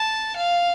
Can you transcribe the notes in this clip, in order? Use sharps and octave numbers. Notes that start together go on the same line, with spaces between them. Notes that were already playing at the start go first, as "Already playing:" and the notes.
Already playing: A5
F5